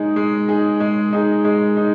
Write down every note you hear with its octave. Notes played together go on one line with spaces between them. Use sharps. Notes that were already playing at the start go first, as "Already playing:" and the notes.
Already playing: G#3 D#4 G#4
G#3
D#4 G#4
G#3
D#4 G#4
G#3
D#4